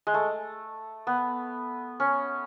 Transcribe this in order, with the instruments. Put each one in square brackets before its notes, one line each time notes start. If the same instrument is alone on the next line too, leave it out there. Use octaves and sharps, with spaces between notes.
[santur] G#3
A3
B3
C#4